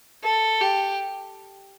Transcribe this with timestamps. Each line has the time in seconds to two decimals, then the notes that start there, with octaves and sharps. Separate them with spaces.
0.23 A4
0.61 G4